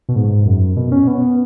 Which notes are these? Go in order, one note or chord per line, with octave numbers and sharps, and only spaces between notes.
B2
G#2
F#2
B2
C#4
B3